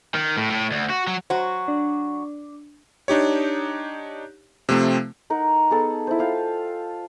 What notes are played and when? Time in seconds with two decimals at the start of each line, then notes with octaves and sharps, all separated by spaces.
0.14 D#3
0.37 A2
0.50 A2
0.71 D2
0.90 F#4
1.07 F#3
1.30 F#3 F#4 C5
1.68 D4
3.08 D4 D#4 G4 C#5
4.69 C3 F3 A3 C4
5.30 D#4 A#4 F#5
5.71 B3 G#4 A4 A5
6.07 E4 C5
6.19 F4 F5 G5